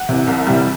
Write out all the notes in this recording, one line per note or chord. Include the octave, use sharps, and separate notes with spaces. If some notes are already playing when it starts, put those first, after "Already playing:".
Already playing: F#5
C3 E3
C2
C3 E3 G3